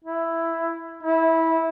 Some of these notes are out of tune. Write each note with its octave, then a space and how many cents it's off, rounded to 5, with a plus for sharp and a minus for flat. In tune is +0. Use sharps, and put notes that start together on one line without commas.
E4 +5
E4 -15